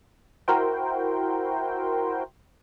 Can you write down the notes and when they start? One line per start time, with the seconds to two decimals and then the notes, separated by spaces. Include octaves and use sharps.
0.48 E4 F#4 A#4 C5 G5